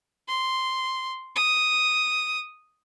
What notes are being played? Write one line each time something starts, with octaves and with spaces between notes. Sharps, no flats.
C6
D#6